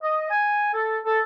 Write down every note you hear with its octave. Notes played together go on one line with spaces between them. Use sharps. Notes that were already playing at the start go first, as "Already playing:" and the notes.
D#5
G#5
A4
A4